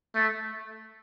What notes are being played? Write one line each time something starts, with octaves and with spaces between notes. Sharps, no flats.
A3